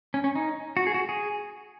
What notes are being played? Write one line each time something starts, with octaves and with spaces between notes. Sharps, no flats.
C#4
C#4
D#4
F#4
G#4
F#4
G#4